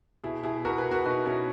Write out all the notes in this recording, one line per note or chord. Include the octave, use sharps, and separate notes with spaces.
B2 E4 G#4
B2 E4 G#4
B2 F#4 A#4
G#4 B4
B2
F#4 A#4
B2 D#4 F#4
B2 C#4 E4